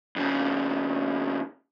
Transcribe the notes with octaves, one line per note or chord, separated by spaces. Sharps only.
F2 C#3